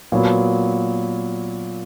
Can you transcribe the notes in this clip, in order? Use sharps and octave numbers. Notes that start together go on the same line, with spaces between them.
A#2 F#3 B3